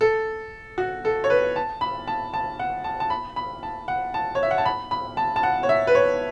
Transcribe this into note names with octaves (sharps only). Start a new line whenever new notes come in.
A4
F#4
A4
C#5
B4
A5
B5
A5
A5
F#5
A5
A5
B5
B5
A5
F#5
A5
C#5
E5
F#5
A5
B5
B5
A5
A5
F#5
C#5
E5
B4
C#5